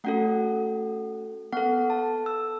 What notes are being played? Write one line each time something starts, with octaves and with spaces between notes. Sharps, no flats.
A3 C#4 F#4 A4 F#5
B3 A4 F#5
A5
E6